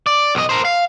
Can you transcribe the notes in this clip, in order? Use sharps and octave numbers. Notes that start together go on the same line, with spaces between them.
D5
B1 D#5
A#4 C5
F5